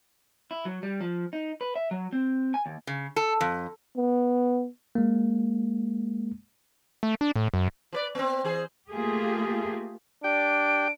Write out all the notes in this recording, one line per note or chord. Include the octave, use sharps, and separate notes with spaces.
E4
F#3
G3
F3
D#4
B4
E5
F#3
C4
G#5
D#2
C#3
A4
F2
B3
G#3 A#3
A3
D4
A2
F#2
F3 B4 D5
B3 C4
E3 G#4 C5
A3 A#3 F4 G4 G#4
D4 G4 D5 G5 D7